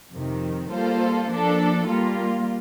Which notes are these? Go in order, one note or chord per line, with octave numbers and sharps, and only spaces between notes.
F2 C3 D#3
G3 A#3 F4 A4 C5
F3 A#3 D4 A4
G3 A#3 F4